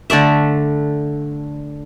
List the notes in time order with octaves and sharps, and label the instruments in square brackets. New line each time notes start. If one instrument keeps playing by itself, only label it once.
[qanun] D3 A3 D5 E5